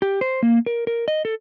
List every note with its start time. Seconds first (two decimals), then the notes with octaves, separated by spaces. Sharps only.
0.02 G4
0.21 C5
0.43 A#3
0.66 A#4
0.87 A#4
1.08 D#5
1.25 A4